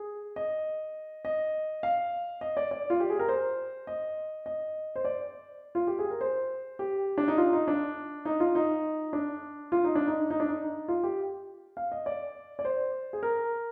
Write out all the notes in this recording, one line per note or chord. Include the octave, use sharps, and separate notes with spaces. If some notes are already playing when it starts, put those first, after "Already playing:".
Already playing: G#4
D#5
D#5
F5
D#5
D5
D5
F4
G4
G#4
A#4
C5
D#5
D#5
C5
D5
F4
G4
G#4
A#4
C5
G4
D4
D#4
F4
D#4
D4
D#4
F4
D#4
D4
F4
D#4
D4
D#4
D#4
D4
D#4
F4
G4
F5
D#5
D5
D5
C5
G#4
A#4